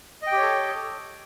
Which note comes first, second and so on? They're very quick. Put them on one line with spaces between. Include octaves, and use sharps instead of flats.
D#5 G5 G4 C#5 A4